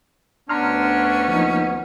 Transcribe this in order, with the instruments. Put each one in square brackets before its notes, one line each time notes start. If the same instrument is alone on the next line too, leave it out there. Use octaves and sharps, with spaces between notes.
[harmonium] D2 B3 [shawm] C#4 [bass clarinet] D4 [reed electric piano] A#5 C6 F6
[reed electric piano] F3 A#3 D#4